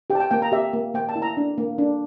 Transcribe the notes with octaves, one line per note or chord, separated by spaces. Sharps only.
G4 G5
A5
G5
A#3 G5
A#5
G4 E5
A#3
A#3 G5
A5
E4
A#5
D4
A#3
D4